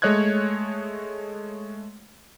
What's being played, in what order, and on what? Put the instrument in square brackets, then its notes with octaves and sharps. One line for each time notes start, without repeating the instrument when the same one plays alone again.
[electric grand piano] G#3 A3 C#5 D#5 F#6 G#6